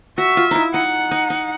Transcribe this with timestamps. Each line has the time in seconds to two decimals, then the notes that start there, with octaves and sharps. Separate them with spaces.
0.18 F#4 E5
0.37 F4
0.51 D#4 E4
0.74 D#4 F#5
1.11 D#4
1.30 D#4